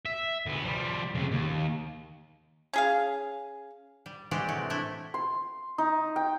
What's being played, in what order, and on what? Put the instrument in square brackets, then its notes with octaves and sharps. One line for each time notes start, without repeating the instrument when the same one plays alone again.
[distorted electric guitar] E5
D2 B3
F3 G3
F2 C#3
D#2
[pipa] C#4 G#4 F5
[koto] G3
E3 G#3 C4 F#4 G4 D5
A2 C3 F#4
A3 D4 E4
[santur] C6
D#4
G5